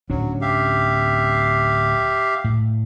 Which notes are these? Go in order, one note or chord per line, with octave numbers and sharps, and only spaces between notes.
D1 F#3 C#4 D4
G4 E5 F5
A2